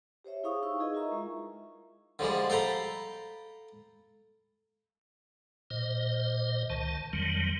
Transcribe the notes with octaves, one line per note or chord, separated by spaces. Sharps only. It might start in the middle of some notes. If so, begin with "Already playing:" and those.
G4 C5 C#5 E5
E4 G#4 F5 C#6 D#6
D#4 F5 C#6 E6
D#4 F4 G#4 B4 D#5
E4 F4 A#4 E5 A#5 C#6
G#3
D3 F3 G3 G#3
A4 F5 G5 A#5 B5
A#2 C5 D#5
C#2 D#3 A5
F2 D#3 F#3 G3